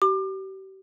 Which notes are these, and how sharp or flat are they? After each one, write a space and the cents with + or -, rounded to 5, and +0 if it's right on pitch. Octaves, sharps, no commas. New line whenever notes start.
G4 -35 D6 +30